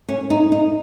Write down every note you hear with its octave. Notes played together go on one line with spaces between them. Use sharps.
C#4
D#4
D#4